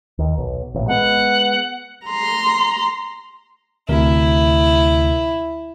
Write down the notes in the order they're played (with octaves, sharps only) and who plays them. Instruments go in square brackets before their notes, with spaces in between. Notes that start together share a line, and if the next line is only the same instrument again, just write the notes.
[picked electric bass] D#2
B1
A1 A#2
[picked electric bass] G#3 A3 B3 [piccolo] F#5
[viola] A#5 C6
[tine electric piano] D2 C3 A#4 [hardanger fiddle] E4